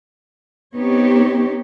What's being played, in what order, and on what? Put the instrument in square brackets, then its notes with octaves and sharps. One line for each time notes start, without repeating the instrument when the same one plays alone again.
[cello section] B3 C4 D#4 G4 C#5